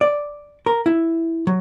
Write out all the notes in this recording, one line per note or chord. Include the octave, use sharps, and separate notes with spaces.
D5
A#4
E4
F#3